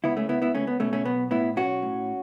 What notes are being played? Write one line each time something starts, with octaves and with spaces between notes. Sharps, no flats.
C#2 B3 E4
A3 C#4
C#2 B3 E4
B3 E4
C#2 A3 C#4
B3
B2 A3 C#4
A3 C#4
B1 B3
A2 B3 E4
B1 C#4 F#4
A2